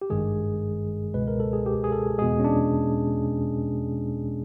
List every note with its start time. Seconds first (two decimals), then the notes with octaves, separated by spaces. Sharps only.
0.02 G4
0.10 G#1 G2 D#3 G#3 G#4
1.14 C#2 B2 G#3 B4
1.27 A#4
1.40 A4
1.53 G#4
1.66 G4
1.84 G#4
1.92 A4
2.18 E2 B2 G#3 G#4
2.40 C#4
2.44 D4